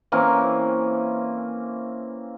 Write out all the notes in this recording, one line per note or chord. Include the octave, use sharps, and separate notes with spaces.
E3 A#3 C4 C#4